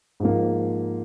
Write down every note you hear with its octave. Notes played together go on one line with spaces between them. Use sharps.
G#2 F3 A#3